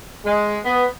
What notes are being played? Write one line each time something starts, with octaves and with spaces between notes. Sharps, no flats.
G#3
B3